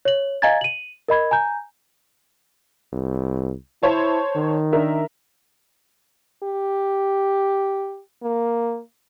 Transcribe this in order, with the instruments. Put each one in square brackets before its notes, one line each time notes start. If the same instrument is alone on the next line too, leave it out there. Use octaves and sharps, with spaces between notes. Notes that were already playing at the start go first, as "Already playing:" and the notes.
[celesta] C#5 F#7
D#5 F5 G#5 A#5 G#6 A6
D#7 F#7
A#4 D#5 B5 G#6
G#5 A#5 G6
[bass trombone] C2
[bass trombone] E4 [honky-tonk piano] C5 C#5 A5
[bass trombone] D#3
[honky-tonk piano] D4 A#4 E5
[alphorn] G4
A#3